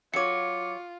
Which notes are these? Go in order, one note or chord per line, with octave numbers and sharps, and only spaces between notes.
F#3 F4 C#5 D6 C#7